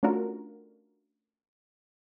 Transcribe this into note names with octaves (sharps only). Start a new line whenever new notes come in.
A3 C#4 D4 F4 F#4 A#4